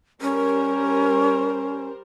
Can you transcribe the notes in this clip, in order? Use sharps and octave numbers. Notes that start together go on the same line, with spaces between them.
G3 C#4 A#4 C5